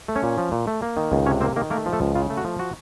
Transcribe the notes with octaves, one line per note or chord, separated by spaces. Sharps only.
A3
C#4 C#5
A#2
F3
A#2
A3
A#3
D#3
C#2
C3 C#4 C#5
A#3 C4 C5
D#3 A#3 A#4
A3 A#3 A#4
F3
A3 A4
C#2
C#3 F4
A3
F#4
F3
F#4